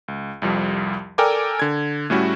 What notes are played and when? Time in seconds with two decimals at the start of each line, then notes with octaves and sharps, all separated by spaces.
0.08 C#2
0.42 C2 F2 F3 G3
1.18 A4 A#4 D5 G5 G#5 D6
1.59 D3 G#6
2.10 A2 G3 A3 C#4 E4 F#4